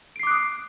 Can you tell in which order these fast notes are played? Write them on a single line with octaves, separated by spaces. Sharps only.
D7 C7 D6 F#6 D#6